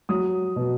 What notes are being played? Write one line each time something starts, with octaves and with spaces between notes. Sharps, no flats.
F#3 D#6
B2